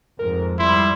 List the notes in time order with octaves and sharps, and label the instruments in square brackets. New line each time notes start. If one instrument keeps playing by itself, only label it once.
[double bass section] F2 G#2 [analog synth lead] A#4
[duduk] G3 [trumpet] E4 [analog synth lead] C6